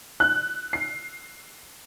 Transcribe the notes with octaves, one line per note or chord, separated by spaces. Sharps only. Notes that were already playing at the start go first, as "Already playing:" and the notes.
F#6
C7